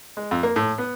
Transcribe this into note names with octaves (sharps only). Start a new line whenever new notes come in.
G#3
F2
A#3
A2
B3